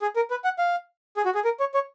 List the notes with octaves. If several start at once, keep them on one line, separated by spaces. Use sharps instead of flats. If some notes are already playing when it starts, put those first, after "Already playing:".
G#4
A#4
B4
F#5
F5
G#4
F#4
G#4
A#4
C#5
C#5